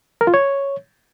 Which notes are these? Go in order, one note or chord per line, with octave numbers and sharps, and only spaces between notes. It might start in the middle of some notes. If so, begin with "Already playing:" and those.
A#4
F4
C#5